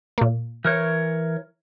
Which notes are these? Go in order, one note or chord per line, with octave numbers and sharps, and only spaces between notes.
A#2 A#3
E3 A#4 C#5